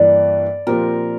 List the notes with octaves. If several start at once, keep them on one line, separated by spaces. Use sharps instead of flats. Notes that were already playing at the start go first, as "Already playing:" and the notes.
Already playing: G2 E3 A#3 D5
A#2 F3 C4 G4 A#4